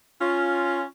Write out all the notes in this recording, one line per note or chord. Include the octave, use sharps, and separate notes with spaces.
C#4 F4